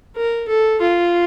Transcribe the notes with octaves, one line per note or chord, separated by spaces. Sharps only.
A#4
A4
F4